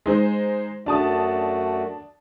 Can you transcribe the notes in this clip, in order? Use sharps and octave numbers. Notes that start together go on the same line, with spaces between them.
G#3 D#4 C5
F#2 A3 D4 F#4 A5 D#6